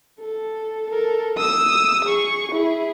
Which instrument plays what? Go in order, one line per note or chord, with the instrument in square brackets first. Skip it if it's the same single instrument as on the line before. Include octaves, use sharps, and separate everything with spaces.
[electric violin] A4
A4 A#4
D#6 E6
G#4 C#6
E4 G#4